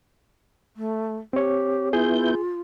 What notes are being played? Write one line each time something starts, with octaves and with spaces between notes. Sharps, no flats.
A3
C4 G4 C#5
B3 E4 F4 G#4 G6